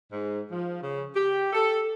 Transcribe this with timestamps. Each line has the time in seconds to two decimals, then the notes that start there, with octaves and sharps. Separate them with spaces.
0.12 G#2
0.51 F3
0.81 C#3
1.15 G4
1.53 A4